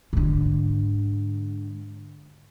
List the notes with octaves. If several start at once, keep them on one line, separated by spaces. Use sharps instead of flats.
G#2 D3